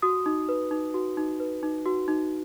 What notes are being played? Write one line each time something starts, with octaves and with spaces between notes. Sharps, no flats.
F#4 D#6
D#4
B4
D#4
F#4
D#4
B4
D#4
F#4
D#4